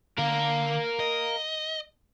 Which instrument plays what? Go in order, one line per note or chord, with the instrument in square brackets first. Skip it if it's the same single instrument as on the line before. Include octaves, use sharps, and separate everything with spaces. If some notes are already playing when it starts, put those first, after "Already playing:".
[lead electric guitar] D3 [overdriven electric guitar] A#4 F5
[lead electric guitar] D#5